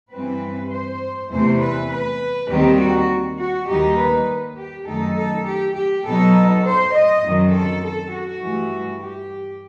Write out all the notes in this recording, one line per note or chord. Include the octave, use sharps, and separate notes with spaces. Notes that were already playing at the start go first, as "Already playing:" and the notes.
G2 E3 G3 C4 B4
C5
E2 C3 E3 A3 C5
B4
B4
D#2 D#3 G3 C4 G4
F#4
F#4
D#2 D#3 G3 D#4 G4
B4
G4
F#2 D#3 A3 D#4 A4
A4
G4
G4
B2 F#3 B3 D#4 A4
C5
D#5
F#2 D#3 F#3 C4
A4
A4
F#4
G2 E3 A3
G4